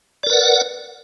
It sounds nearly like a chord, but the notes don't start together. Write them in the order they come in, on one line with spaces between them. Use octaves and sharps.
D5 A#4 B4 F#5